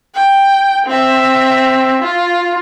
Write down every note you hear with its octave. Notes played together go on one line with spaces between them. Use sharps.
G5
C4 E5
F4